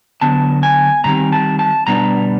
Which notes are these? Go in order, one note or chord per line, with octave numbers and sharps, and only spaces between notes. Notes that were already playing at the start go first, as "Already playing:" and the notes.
D3 F#3 B3 D4 A5
G#5
G2 D#3 G3 C4 A#5
A5
A5
B2 G3 B3 D4 A#5